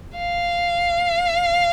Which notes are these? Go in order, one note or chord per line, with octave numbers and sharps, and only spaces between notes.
F5